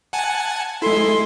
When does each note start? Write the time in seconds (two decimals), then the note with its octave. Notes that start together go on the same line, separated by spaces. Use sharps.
0.13 F#5 G#5 A5
0.82 G#3 E4 A4 C6